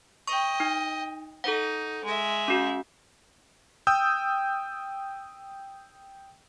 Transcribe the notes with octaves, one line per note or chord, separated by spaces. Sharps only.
D#5 G5 C#6
D#4
D#4 A4 F#5
G#3 E5
C#4 F#4
G5 D#6 E6 G6